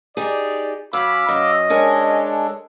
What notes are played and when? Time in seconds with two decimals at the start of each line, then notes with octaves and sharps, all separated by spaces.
0.17 D#4 G4 G#4 D5
0.93 F#2 C#4 F5 B5 D6 E6
1.29 F#2 C#4 D#5
1.70 G#3 D4 A4 A#4 C#5 G#5